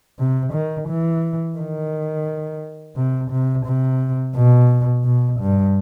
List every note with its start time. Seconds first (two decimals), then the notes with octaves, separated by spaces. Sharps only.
0.19 C3
0.53 D#3
0.88 E3
1.58 D#3
2.96 C3
3.31 C3
3.66 C3
4.36 B2
5.05 B2
5.40 G2